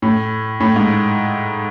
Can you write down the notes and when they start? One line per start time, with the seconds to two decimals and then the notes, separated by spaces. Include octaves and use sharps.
0.02 A2
0.60 A2
0.76 G#2